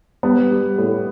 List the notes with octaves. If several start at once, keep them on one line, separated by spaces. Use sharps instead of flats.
G3 B3
G3
A2